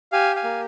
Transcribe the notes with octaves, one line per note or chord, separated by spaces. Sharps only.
G4 F5 G#5
F5 G#5
A#3